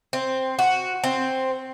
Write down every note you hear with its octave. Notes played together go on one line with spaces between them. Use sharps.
C4
F#4
C4